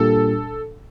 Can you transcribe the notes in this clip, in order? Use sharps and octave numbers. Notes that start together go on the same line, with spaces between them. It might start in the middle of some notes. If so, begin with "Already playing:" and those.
Already playing: A#2 G3 D4 G4 A4